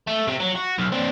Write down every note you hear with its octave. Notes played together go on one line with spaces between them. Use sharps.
A3
C3 C4
F#3
F#4
B1
C4 D4